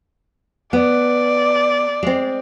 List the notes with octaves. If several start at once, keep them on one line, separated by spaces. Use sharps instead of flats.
B3 D5
G#3 C4